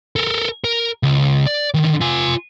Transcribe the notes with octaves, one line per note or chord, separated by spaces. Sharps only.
A4 A#4
A#4
C#2
D5
D3 D#3
F4 G#5